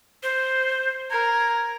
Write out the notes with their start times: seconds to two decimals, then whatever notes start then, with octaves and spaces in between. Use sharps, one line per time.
0.23 C5
1.10 A#4 G#6